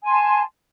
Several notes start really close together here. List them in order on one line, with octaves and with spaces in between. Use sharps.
G#5 C6 A5